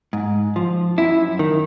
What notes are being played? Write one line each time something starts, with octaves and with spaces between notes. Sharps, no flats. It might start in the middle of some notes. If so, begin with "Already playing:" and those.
G#2
F3
F#2 E4
D#3